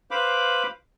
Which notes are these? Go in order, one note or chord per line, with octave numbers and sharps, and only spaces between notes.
B4 C5 F5 B5 D6